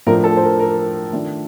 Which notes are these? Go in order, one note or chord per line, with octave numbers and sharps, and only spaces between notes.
A2 F3 A3 D4 F4 A#4
A4
C5
A#4
A#4
D#3 A3 D4 F4